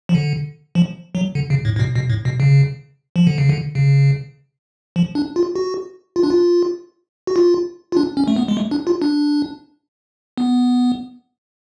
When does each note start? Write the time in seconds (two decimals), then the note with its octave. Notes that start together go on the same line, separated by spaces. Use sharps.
0.09 F3
0.15 D3
0.75 F3
1.15 F#3
1.35 D3
1.50 C#3
1.65 A2
1.76 A2
1.79 B2
1.95 B2
2.10 A2
2.25 B2
2.40 C#3
3.16 F3
3.27 D3
3.38 C#3
3.49 D3
3.75 C#3
4.96 F3
5.15 D4
5.36 F4
5.56 F#4
6.16 F4
6.23 D4
6.30 F4
7.27 F#4
7.36 F4
7.92 F4
7.97 D4
8.17 C#4
8.28 A3
8.36 B3
8.48 G#3
8.57 A3
8.71 D4
8.87 F4
9.02 D4
10.38 B3